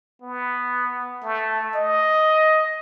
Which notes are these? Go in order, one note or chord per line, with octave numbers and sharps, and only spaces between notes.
B3
A3
D#5